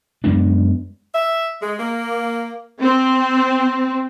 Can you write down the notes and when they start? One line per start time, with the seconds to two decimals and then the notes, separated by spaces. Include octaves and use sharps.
0.24 F#2 G#3 B3 D4
1.15 E5
1.62 G#3
1.79 A#3
2.81 C4